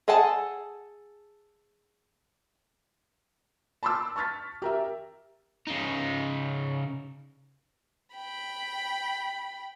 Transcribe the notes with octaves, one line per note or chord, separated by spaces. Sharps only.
G#4 A4 F#5 G#5 A5
A5 B5 C6 D6 E6
A5 C#6 F6 A6 B6
G4 A#4 E5
C#3 D#4
G5 B5